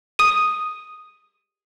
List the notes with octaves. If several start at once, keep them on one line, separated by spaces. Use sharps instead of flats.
D#6 D#7